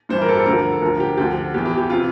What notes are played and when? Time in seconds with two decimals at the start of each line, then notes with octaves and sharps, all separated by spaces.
0.09 G2 E3 C5
0.22 A#4
0.29 A4
0.34 G4
0.40 A4
0.46 D2 D3 F3 A#4
0.72 A4
0.81 D2 D3 F3 A#4
1.00 G4
1.17 D2 D3 F3 G4
1.54 E2 E3 G4
1.65 G4
1.77 G4
1.90 C3 E3 F4